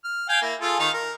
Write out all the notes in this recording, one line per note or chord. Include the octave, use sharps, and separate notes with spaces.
F6
F5 G5 G#5
A#3 E4
F4 G#4 A4
D#3 D#4 F5
A#4